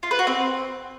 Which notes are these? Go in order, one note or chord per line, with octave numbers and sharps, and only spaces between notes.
F4
B4
F#4
C4